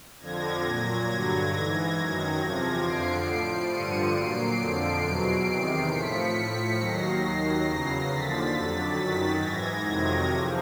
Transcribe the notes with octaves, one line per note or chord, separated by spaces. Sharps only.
F2 D3 F3 G#6 A#6
A#2 F#3
G2 D3 F#3
G#2 E3
F#2 D#3 F#3 G#6 A#6
E2 C3 F3
F2 D3 F3 C7 D7
A2 F3
G2 D3 F3 C#7 D#7
A#2 F#3 C7 D7
F2 D3 F3
E2 B2 F#3
E2 C3 D#3
A2 F3 B6 C#7
A2 F3
D#2 D#3 F#3 A#6 C7
D#2 D#3 F#3
E2 C#3 F#3
D#2 D3 F3 A6 B6
F2 D3 F#3
F#2 D#3 F#3 A6 B6
G#2 E3 G#6 A#6
F2 C3 D#3 F#3
E2 C3 F3